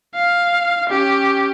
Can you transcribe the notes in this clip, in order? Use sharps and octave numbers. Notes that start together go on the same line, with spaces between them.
F5
C#4 G4